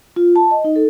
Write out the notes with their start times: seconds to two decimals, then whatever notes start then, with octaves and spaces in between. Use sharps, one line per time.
0.16 F4
0.36 A5
0.51 D#5
0.64 D#4
0.76 A4